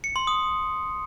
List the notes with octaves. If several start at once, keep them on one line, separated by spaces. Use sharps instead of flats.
C#7
C6
D#6